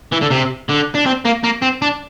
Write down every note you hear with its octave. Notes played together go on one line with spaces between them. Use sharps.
E3
D3
C3
D3
D4
C4
A#3
A#3
C4
D4